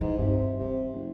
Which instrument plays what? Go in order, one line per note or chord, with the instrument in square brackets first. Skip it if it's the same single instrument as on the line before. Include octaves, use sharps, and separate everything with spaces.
[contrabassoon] G#2 [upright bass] E3
[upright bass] G2 [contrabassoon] C3
[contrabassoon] C3 [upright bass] D#3 E3
[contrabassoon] F#1